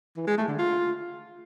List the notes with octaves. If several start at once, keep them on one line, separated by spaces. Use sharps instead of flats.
E3
G#3
A3
D3
F4